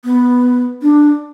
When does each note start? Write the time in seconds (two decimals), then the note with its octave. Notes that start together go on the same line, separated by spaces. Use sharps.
0.05 B3
0.82 D4